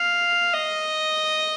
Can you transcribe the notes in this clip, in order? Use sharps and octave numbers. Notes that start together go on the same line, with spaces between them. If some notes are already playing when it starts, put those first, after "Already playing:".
Already playing: F5
D#5